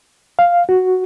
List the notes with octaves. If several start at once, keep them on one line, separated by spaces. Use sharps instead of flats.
F5
F#4